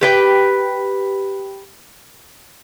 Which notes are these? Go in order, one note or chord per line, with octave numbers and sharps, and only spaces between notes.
G4 B4 G5